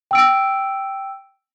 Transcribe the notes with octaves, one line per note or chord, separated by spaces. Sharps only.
G5 E6 D7